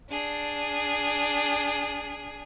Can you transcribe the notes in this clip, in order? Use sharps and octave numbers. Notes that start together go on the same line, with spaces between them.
D4 G#4